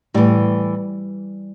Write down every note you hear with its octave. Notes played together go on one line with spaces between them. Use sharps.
A2 E3 G3